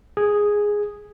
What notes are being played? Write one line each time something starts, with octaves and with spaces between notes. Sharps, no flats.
G#4